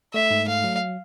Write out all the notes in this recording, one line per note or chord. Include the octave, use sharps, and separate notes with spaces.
A3 E5
G#2
A3 F5
F#3